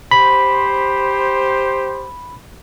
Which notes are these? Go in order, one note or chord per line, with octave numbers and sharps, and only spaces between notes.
G4 C5 B5